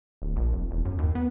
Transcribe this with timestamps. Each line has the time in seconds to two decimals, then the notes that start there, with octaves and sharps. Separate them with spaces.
0.22 D1
0.36 A#1
0.53 F1
0.71 E1
0.85 F#2
0.98 D#2
1.15 B3